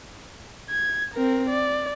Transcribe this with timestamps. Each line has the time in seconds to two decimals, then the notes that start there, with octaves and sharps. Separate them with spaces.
0.70 G#6
1.14 C4 A#4
1.50 D5